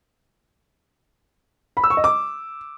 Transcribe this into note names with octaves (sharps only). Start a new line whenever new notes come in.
B5
E6
C#6
D#5
D6